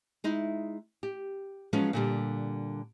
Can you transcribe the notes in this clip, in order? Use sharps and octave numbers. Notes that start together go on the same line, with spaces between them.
G#3 D#4 E4
G4
F3 F#3 G#3 B3 C#4
A#2 D3 G3